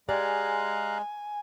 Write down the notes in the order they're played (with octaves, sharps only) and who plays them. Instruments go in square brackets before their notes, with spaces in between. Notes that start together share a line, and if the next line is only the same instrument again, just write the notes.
[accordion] G#3 [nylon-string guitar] G4 D5 [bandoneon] F5 A#5 F#6 [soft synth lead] G#5